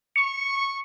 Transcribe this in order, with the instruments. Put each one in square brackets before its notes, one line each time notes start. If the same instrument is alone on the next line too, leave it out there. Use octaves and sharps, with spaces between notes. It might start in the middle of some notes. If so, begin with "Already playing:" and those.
[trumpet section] C#6 [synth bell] C#7